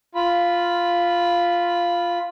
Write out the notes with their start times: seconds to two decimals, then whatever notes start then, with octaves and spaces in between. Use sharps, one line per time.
0.15 F4 B5